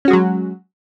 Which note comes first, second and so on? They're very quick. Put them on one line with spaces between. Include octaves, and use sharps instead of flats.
C#4 F#4 G#3 F#3